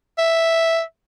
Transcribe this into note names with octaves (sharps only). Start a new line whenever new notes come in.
E5